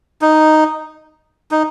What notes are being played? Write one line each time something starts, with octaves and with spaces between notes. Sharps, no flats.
D#4
D#4